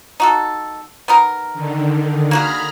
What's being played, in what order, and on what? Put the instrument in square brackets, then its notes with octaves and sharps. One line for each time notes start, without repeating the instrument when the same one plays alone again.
[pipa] D#4 F#4 A4
B3 D#4 A#4
[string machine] D3 D#3
[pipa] A#3 F#4 G#4 [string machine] A#5 B5 F6